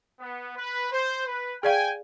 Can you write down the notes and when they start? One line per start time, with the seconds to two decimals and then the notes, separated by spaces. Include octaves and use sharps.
0.20 B3
0.57 B4
0.92 C5
1.27 B4
1.63 G#4 D5 F5 G5 G#5